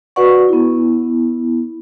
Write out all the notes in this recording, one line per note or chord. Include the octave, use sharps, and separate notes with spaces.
F#4 B4 D5 F#5 C#6
B3 E4